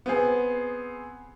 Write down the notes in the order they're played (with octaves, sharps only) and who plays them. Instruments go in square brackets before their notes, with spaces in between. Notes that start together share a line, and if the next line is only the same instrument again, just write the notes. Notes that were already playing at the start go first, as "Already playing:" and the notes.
[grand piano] B3 C4 G#4